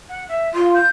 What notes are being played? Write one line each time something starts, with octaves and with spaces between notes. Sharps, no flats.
F#5
E5
F4 C6
G6